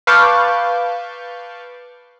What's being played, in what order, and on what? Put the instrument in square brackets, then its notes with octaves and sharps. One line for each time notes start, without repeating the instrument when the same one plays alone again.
[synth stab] B4 F5 A5 C#6 D6 G6